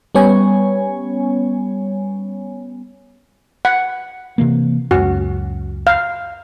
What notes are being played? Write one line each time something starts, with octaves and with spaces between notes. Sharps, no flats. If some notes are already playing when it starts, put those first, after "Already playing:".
G3 B3 C#4 C#5 G#5
F#5
C3 E3 A#3
C#2 F#2 F#4
F5